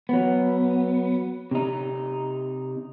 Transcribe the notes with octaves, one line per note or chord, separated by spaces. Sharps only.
F#3 B3
C3 D#4